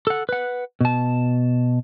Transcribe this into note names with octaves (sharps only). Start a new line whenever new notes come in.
A4 F#5
B4 F#5
B2 A5